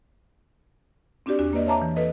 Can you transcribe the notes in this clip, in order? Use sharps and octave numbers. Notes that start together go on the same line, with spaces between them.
C4 D4 F#4 G4 D5
E2 D4 F#4
A#3 B4 D5 D#5
C#5 E5 A5 A#5 D6
E3
A4 B4 D#5